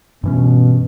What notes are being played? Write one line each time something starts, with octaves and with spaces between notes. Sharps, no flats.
G2 B2 E3 C#4